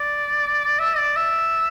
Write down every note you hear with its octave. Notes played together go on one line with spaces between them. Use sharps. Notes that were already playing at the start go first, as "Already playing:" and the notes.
Already playing: D5
E5
D5
E5